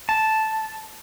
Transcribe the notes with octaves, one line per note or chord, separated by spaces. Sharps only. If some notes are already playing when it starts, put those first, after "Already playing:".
A5